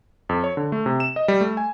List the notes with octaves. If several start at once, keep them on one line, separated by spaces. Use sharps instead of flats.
F2
C#5
D3
A3
C3
E7
D#5
G3
A3
G#5